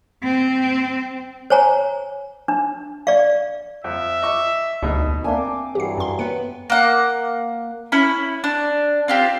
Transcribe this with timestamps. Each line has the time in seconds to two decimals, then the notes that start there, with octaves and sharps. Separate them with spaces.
0.23 C4
1.50 C5 C#5 G#5 A#5
2.48 D4
3.07 D5 F5
3.84 F2 E5
4.22 D#5 C#6 D6
4.83 D2 B2 D#4
5.24 A3 A#3 C4 D4 G#5
5.36 D6
5.75 G2 E3 F#3 G4 C7
5.98 F#2 C6
6.19 B3 B4 C#7
6.70 A#3 F#5
7.92 C#4 E4 B5
8.44 D4
9.08 C4 F4 G4